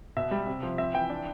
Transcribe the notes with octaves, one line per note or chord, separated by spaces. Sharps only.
B2 E5
G3
C3
F3
C4 E5
E3 G5
D4